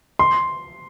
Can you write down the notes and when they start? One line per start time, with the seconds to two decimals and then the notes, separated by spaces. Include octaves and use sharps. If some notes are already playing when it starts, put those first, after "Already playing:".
0.19 C6